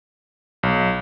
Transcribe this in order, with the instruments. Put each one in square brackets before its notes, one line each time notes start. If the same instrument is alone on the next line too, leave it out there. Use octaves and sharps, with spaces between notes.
[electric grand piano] B1